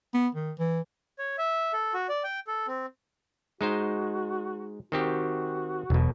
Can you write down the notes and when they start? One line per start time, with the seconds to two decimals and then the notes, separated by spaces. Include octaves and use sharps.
0.14 B3
0.35 D#3
0.59 E3
1.19 C#5
1.38 E5
1.73 A4
1.94 F#4
2.09 D5
2.24 G5
2.47 A4
2.67 C4
3.61 G#3 D#4 F#4 C5
4.92 D#3 C4 F#4 G4
5.90 E1 B1 B2